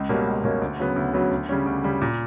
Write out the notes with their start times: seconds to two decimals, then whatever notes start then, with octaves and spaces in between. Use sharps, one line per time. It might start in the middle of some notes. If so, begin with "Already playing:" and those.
Already playing: C#2
0.09 B2 G3 A#3 C#4
0.27 C#2
0.44 B2 G3 A#3 C#4
0.62 D2
0.80 C#3 F#3 B3
0.96 D2
1.14 C#3 F#3 B3
1.31 D2
1.49 C#3 G3 C#4
1.66 D2
1.84 C#3 G3 C#4
2.02 A#2